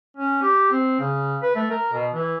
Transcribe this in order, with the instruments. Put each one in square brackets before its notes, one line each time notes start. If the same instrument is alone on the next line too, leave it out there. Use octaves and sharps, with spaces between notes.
[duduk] C#4
G4
C4
C#3
B4
A3
A#4
B2
E3